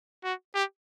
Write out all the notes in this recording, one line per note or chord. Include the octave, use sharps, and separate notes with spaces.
F#4
G4